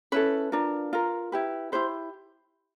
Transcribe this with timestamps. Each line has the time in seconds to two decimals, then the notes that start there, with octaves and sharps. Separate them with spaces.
0.12 C#4 E4 A4 B4
0.52 D4 F4 A#4
0.93 F4 A#4
1.32 E4 G4 B4
1.72 E4 G4 B4 C5